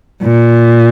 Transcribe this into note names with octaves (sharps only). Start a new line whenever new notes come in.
A#2